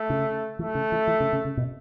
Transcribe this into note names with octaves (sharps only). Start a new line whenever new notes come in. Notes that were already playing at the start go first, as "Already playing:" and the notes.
Already playing: A3
C#3
E3 A3
C#3
E3
E3
C#3
C#3
C#3
B2